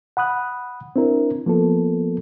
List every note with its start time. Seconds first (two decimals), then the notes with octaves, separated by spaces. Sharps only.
0.17 F#5 B5 D#6 F#6
0.96 C4 D4 E4 A#4
1.46 F3 A#3 B3 A4